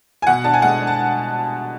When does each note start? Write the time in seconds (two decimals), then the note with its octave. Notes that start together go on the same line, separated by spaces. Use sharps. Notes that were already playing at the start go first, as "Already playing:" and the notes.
0.22 G#5
0.27 B2 F#5
0.44 D4 A5
0.54 G#5
0.62 G#3 F#5
0.80 D4
0.87 A5